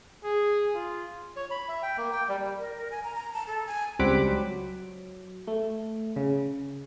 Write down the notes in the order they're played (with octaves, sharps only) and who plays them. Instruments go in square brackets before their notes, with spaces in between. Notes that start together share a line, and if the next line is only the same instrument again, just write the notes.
[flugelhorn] G#4
F4
[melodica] C#5
B5
E5
G5
A#3
G5
G3
[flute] A#4
A#4
G#5
A#5
A#5
A5
A4
G#5
[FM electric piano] C#2 G3 C4 F#5 B5 D6
F#3
A3
C#3